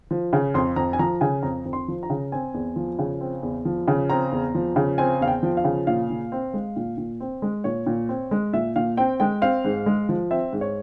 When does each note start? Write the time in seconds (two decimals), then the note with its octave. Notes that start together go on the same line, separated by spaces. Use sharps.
0.11 F3
0.33 C#3
0.54 F2 C6
0.76 F2 A#5
0.93 G#5
0.99 F3 A#5
1.21 C#3 G#5
1.43 F2 A#5
1.65 F2
1.73 C6
1.88 F3
2.03 A#5
2.10 C#3
2.32 C4 G#5
2.54 E2
2.76 F3
2.99 C#3
3.21 C4
3.43 E2
3.65 F3
3.88 C#3
4.10 C4 A#5
4.32 E2
4.55 F3
4.76 C#3
4.98 C4 G#5
5.21 E2 F5
5.28 G5
5.43 F3
5.57 F5
5.64 C#3
5.87 A#2 F5
6.10 A#2
6.32 C4
6.54 G#3
6.76 A#2
6.98 A#2
7.20 C4
7.42 G#3
7.64 A#2 C#5
7.86 A#2
8.09 C4
8.31 G#3
8.53 A#2 E5
8.76 A#2 F5
8.97 C4 G5
9.20 G#3 G5
9.42 C4 F5
9.65 G#2
9.86 G#3
10.09 F3
10.31 C4 E5
10.53 G#2
10.61 C#5